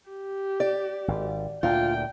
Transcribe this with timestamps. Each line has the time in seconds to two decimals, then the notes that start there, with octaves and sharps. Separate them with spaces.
0.10 G4
0.60 D5
1.08 G#1
1.63 D2 A#2 F4 G5